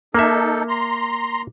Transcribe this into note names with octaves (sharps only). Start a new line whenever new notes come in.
A#3 D#4 A4 E5
A#5 C6